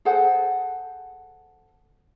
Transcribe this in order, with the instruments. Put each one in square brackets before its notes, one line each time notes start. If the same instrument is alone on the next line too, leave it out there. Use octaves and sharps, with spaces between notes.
[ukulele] G#4 A4 C5 F#5